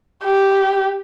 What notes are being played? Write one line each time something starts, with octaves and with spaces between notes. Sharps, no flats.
G4